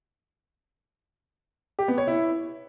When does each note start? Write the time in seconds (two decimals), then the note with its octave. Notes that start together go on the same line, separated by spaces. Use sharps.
1.79 G4
1.88 B3
1.98 C#5
2.08 E4